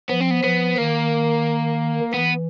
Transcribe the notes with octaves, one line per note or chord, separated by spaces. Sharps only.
F3 B3
C4
B3
F3 B3
D#3 A#3
E3 B3